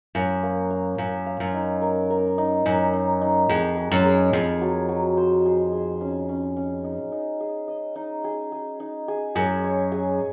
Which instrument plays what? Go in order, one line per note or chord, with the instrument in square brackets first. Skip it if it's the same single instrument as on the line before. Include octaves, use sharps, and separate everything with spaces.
[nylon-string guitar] F#2 [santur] F5
[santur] A#3
F5
[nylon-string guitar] F#2 [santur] F5
[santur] F5
[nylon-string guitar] F#2
[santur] D#4
A#4
A#4
D#4
[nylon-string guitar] F#2 [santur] D#4
[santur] D#4
D#4
[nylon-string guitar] F2 [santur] G#4
[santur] G#4
[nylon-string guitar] F#2
[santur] G#4
[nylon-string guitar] F2 [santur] G#4
[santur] F#3
F#3
C5
G#4
G#4
C#4
C#4
C#4
D#4
D#4
G#4
D#5
D#4
G#4
G#4
D#4
G#4
[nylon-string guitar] F#2 [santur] G#4
[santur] C#5
G#4